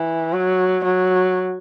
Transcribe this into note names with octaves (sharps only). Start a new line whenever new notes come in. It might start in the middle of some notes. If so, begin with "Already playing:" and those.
Already playing: E3
F#3
F#3